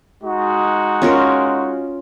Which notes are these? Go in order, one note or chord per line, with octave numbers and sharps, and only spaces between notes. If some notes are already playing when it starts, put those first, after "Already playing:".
G#3 D#4 F#4
C#4 F4 A#4